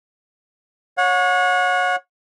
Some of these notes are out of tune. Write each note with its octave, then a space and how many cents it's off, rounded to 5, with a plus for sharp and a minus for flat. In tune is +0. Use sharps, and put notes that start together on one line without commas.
C#5 +0 F#5 -35